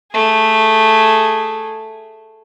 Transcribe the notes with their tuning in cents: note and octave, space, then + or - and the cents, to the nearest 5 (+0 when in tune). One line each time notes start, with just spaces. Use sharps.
A3 +0 G#4 +0